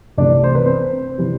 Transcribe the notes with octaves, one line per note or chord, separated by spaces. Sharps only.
C2 C3 E3 A3 D4 D5
C5
B4
C4 C5
C3 E3 G3